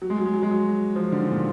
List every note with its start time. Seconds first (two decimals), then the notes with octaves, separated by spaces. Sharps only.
0.02 F#3
0.10 G#3
0.18 F#3
0.25 G#3
0.34 F#3
0.43 G#3
0.51 F#3
0.96 F3
1.12 D3
1.19 D#3
1.31 A#2